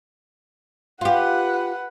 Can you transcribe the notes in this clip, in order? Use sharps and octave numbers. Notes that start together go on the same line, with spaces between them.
F4 G4 B4 F#5